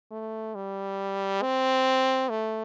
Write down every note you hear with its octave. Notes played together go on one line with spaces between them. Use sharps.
A3
G3
C4
A3